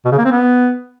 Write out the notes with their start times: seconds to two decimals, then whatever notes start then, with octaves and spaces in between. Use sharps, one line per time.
0.05 B2
0.11 C#3
0.18 A#3
0.25 C4
0.32 B3